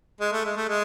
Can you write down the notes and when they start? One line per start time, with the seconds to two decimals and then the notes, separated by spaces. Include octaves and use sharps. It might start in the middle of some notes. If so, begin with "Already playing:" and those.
0.21 G#3
0.32 A3
0.45 G#3
0.56 A3
0.69 G#3